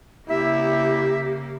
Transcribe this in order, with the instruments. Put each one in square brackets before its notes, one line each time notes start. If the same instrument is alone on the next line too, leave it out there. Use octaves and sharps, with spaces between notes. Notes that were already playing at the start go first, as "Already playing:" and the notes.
[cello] C#3 A#3 [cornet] E4 [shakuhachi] G4 [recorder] E5